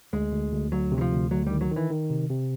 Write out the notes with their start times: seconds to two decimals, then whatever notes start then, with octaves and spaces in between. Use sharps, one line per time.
0.13 D2 G#3
0.32 D2
0.52 D2
0.72 D2 F#3
0.92 C3
0.98 F#3
1.01 F3
1.12 D2
1.31 D2 F#3
1.46 D#3 G3
1.61 F#3
1.71 D#3
1.76 E3
1.91 D#3
2.10 C3
2.30 C3